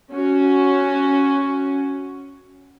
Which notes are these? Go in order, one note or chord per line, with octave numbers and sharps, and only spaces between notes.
C#4 F#4